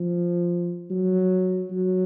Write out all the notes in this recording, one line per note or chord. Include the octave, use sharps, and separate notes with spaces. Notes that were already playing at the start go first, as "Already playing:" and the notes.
Already playing: F3
F#3
F#3